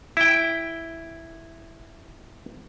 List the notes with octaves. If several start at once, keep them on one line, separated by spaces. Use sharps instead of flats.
E4 G5